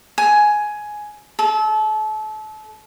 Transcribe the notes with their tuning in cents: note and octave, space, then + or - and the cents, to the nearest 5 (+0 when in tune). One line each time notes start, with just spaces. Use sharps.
G#5 +10
A4 -30